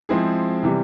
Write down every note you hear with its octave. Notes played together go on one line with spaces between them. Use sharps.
F3 G#3 C4 E4 G#4
C3 E3 G3